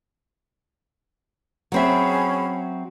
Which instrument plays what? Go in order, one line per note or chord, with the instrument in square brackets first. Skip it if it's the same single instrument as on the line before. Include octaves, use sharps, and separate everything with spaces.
[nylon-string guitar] F#3 C4 E5 [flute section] C#4 G#4 B5